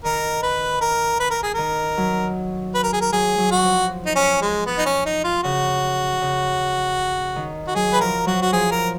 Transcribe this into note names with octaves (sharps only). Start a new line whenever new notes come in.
D#3 A#4
B4
A#4
B4
A#4
G#4
D#3 A#4
F#3
B4
A#4
G#4
A#4
F#3 G#4
F#3
F#4
F3
D#4
C#4
G#3
B3
D#4
C#4
D#4
F4
C#3 F#4
C#3
D#3
F#4
F#3 G#4
B4
F3 A#4
F#3 F#4
F#4
F3 G#4
A#4